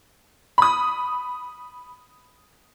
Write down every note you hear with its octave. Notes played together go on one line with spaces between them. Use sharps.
B5 D#6